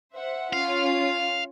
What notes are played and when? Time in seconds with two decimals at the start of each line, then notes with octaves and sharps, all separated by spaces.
0.14 C5 E5 F#5
0.53 C#4 F4 F5